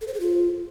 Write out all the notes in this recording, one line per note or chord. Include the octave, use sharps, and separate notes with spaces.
A4
C5
G#4
F4